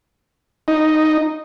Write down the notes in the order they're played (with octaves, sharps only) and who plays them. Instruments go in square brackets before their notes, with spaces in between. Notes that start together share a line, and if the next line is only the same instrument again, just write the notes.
[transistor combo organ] D#4